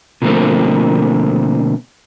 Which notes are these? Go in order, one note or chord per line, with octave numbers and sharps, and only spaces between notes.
B2 D3 F3 A3 A#3 C4